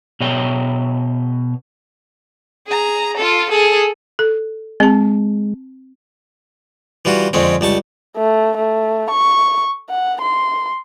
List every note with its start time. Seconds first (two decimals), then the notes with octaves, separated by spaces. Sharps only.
0.21 B2 G#4 C#5 D#5 G5
2.67 G#4 A#5
3.17 F4 A4
3.50 G#4 A4
4.19 A4
4.80 G#3 C4 A5
7.05 E3 G3 F4 F#4
7.33 F2 D3 G#3 C4 C#4
7.61 C#2 G3 A5 C#6
8.17 A3
8.57 A3
9.11 C#6
9.90 F#5
10.21 C6